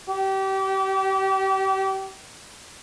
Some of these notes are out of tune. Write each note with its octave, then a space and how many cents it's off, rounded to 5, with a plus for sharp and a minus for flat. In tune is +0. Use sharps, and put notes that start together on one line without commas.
G4 -30